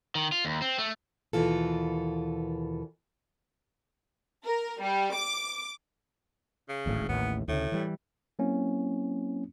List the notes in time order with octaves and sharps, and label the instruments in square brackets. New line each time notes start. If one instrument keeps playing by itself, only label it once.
[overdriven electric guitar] D#3
F4
D#2
C4
A3
[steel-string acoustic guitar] D#2 B2 E3 F4 A4
[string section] A#4
G3
D6
[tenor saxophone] C#3
[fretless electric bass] D1 G#1 A2
[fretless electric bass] A1 D#2 A2 [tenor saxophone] B3
[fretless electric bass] D2 C#3 [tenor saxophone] A2
[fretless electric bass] E3 G3
[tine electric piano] F#3 A#3 C4 C#4 E4